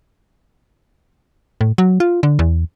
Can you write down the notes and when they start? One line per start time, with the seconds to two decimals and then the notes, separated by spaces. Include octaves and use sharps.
1.61 A2
1.78 F#3
2.00 F4
2.23 D3
2.39 E2